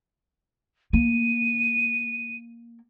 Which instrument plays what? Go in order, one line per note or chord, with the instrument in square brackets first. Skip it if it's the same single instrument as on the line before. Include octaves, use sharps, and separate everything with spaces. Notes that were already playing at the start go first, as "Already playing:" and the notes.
[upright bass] A#3 [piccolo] D#7